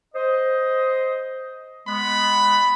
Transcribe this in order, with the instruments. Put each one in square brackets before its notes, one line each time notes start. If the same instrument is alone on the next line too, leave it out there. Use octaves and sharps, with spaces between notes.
[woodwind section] C5 D#5
[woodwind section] G#3 B3 [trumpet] B5